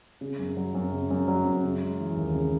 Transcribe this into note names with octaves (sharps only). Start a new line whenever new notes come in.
C#3
F#2
F#3
F#2
C#3
F#2
F#3
F#2
C#3
G#3
E3
D#2
C#3